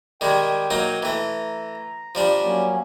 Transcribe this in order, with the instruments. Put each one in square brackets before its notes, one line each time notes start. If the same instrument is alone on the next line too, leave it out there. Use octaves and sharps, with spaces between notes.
[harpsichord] D#3 G3 G#3 [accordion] G5
[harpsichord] F#3 A#3 D#4
[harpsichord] E3 A3 [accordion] A#5
[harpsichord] F3 G3 D4
[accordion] F#3 A#3 C#4